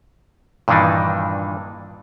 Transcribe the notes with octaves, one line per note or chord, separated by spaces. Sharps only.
G2 A#2 D#3 E3 D4 D#4